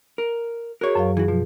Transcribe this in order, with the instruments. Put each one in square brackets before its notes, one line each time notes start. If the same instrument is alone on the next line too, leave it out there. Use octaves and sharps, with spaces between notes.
[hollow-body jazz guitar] A#4
[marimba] F#4 G#4 [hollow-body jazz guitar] A#4 C#5
[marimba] F#2 F#3 F5
[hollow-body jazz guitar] E3 F#4 [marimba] G#4
[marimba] B2 [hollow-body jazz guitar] F3